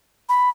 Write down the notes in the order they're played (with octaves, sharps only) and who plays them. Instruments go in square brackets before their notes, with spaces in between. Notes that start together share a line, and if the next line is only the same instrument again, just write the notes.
[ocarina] B5